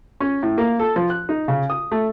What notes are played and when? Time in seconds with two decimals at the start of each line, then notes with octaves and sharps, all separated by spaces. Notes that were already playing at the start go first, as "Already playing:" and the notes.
0.20 C#4
0.43 A2
0.58 A#3
0.80 A4
0.96 F3
1.10 F#6
1.29 D#4
1.48 C#3
1.70 D#6
1.91 A3